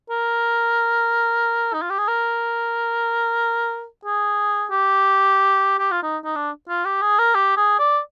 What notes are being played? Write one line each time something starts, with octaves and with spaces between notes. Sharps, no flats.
A#4
D#4
F4
G4
G#4
A#4
G#4
G4
G4
F4
D#4
D#4
D4
F4
G4
G#4
A#4
G4
G#4
D5